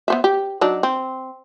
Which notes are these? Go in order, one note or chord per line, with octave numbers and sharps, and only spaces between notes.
B3 C5 E5
G4
F#3 D4 D#4
C4